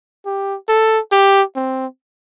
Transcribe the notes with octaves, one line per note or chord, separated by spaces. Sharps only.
G4
A4
G4
C4